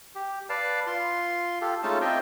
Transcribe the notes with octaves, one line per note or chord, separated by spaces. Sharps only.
G4
B4 D5 F5 A5
F4 C6
F4 G4 A4
G#3 A3 C#4 D#4 F4 A5
C4 F4 G4 D#5 E5 G5